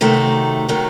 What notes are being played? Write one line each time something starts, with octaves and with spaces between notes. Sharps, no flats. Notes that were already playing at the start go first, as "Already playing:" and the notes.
C3 D#3 F#3 A3
C3 D#3 F#3 A3